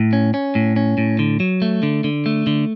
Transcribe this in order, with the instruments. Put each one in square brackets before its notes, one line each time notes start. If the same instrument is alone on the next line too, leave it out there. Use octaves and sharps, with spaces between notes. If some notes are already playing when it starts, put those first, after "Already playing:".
Already playing: [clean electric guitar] A2
C#4
C#4
A2
C#4
A2
D3
F#3
A3
D3
D3
A3
D3